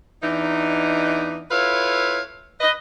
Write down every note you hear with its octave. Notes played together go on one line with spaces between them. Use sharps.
E2 E3 D4 D#4
E4 F4 A4 B4 C#5 F5
B4 D#5